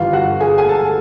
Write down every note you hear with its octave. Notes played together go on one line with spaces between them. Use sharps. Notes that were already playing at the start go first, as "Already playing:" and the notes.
Already playing: G1 G2 E3 F4 F5
F#4 F#5
G#4 G#5
G#5
A4 A5